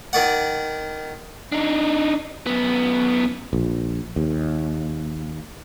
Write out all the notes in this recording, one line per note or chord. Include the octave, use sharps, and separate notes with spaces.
D#3 D5 F#5
D4 D#4
F#2 B3
A#1
D#2